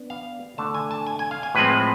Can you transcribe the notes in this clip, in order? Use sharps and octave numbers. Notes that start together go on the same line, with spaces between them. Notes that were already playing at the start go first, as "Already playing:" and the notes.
Already playing: B3 D4
F5
D3 A3 D4 A5
G#5
A5
G#5
G#5
F5
G#5
A2 F3 G#3 C4 B4